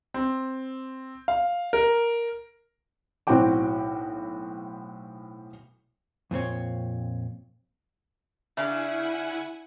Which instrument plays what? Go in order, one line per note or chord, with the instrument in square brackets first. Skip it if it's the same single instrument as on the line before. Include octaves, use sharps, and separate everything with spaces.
[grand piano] C4
F5
A#4
[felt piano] B1 A2 C4 F#4 G5 D6
[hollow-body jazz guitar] F2 A#2 C4 C#5
[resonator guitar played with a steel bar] C#3 D4 [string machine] E4 F#5 G#5 [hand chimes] E5